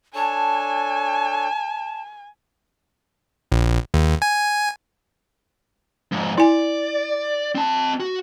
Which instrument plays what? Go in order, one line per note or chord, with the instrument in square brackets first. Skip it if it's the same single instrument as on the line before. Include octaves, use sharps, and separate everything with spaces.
[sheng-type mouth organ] D4 A4 C#5 [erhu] G#5 [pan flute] A5
[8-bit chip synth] A#1
D#2
G#5
[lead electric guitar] F2 G#2
[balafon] E4 G#5 [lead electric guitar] D5
[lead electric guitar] C4 A5
F#4